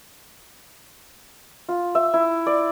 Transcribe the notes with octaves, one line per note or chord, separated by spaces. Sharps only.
F4
E5
E4
D5